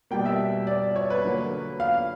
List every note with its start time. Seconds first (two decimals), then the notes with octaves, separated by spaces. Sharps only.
0.11 B2 G3 A#3 G5
0.26 E5
0.67 D5
0.96 C#5
1.10 B4
1.24 D3 F#3 A#3
1.80 F5